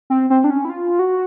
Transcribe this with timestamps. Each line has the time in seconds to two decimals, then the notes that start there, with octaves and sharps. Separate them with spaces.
0.10 C4
0.30 C4
0.44 D4
0.50 C#4
0.65 E4
0.70 F4
0.99 F#4